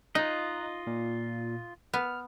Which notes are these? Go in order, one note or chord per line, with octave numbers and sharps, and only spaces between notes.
D#4 F4 D#5 A#5 F#6
A#2
B3 F6